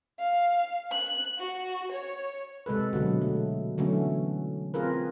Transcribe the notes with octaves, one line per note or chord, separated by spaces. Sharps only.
F5
F#6
F#4
C#5
C3 G#3 A4 B4
B2 D3 F#3
A3
D3 E3 F#3 A3 B3 C#4
C4 F4 G#4 A#4 B4